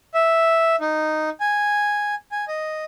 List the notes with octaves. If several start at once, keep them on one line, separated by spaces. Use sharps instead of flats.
E5
D#4
G#5
G#5
D#5